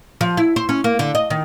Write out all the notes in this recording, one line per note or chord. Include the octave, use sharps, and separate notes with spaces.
F3
E4
C5
C#4
A#3
D3
D#5
D#3